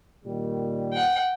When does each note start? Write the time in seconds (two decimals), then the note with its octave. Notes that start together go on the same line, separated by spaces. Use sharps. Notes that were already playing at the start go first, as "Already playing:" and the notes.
0.25 A#2 D#3 G3
0.93 F#5 G5